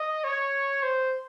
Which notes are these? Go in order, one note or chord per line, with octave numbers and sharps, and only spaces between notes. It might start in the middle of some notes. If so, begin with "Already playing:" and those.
Already playing: D#5
C#5
C5